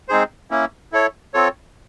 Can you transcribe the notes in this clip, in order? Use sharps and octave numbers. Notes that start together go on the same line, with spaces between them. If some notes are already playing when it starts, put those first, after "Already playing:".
G#3 C4 D#4 G#4 C5
A#3 C#4 E4
E4 A4 C#5
C4 F4 A4 C#5